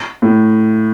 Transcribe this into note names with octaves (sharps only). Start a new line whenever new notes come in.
A2